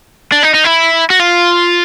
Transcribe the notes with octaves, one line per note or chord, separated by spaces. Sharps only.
D4
D#4
D#4
E4
F#4
F4